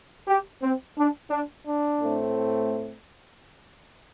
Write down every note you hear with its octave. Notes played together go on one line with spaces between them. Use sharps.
G4
C4
D4
D4
D4
A2 A3 C4